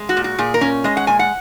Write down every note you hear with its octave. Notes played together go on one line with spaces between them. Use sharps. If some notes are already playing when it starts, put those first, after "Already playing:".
Already playing: G#3
F#4
A#2
F#4
A#2 G#4
A#4
C#4
G#3 D#5
F#5
A#2 G#5
F#5